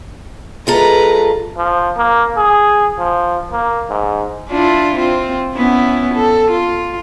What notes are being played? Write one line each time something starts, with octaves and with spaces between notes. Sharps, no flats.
G#3 F4 A4 B4 A#5
F3
A#3
G#4
F3
A#3
G#2
D4 E4 F4
C4 F4
B3 C#4 E4
A4
F4